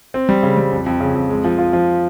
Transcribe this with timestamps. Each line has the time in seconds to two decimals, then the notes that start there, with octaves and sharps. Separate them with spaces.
0.14 C4
0.29 G3
0.43 C#3
0.57 G3
0.72 F2
0.86 F2
1.00 C#3
1.15 F2
1.30 G#3
1.45 F3
1.58 F4
1.73 F3